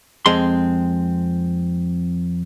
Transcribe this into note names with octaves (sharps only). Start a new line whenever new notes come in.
F2 G#3 C4 C6